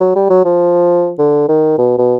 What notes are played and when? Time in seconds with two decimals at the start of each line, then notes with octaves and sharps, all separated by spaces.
0.01 F#3
0.15 G3
0.30 F#3
0.45 F3
1.19 D3
1.49 D#3
1.78 B2
1.98 B2